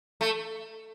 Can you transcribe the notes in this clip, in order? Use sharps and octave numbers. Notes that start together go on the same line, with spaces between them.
A3